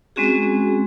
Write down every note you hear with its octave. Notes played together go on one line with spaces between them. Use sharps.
G#3 C4 C#4 F#4 G#4